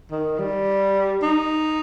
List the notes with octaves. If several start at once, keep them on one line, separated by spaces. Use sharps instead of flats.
D#3
G3
D#4